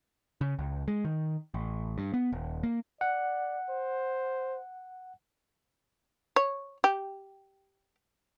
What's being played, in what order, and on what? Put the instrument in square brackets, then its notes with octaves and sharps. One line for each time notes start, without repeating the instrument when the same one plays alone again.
[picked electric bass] C#3
C#2
G#3
D#3
A1
G2
B3
D#1
A#3
[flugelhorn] D5 [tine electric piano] F#5
[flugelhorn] C5
[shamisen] C#5
G4